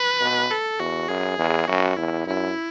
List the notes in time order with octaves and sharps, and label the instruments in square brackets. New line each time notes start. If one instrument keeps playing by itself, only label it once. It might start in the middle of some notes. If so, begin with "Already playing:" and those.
Already playing: [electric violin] B4
[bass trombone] B2
[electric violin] A4
[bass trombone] E2 [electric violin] F#4
[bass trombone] F#2 [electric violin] G#4
[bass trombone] E2
[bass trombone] F#2 [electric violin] F#4
[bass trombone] E2 [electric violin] E4
[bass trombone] F#2 [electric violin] E4